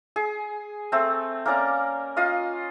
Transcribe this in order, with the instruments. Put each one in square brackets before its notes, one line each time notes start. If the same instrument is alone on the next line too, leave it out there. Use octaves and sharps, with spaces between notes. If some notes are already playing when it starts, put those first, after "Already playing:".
[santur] G#4
A3 C4
A#3 C#4 D5 A#5
F4 D#5 F5